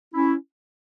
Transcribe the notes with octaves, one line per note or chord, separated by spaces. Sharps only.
C#4 E4